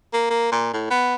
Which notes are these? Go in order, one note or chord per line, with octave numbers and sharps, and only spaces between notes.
A#3
A#3
A#2
A2
B3